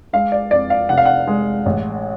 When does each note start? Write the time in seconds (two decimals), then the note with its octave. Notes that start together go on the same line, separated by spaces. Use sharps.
0.13 G#3 F5
0.32 D5
0.51 F2 D5
0.70 F5
0.89 F1 F#5
0.97 F5
1.05 F#5
1.27 G#3
1.66 A1